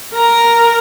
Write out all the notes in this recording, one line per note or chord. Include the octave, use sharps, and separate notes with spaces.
A#4 A#5